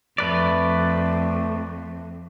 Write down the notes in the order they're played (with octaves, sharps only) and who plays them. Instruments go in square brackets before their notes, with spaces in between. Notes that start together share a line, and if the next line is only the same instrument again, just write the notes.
[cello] F2 [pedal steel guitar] A3 B4 D5